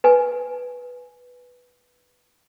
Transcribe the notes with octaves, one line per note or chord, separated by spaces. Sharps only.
B4 G#5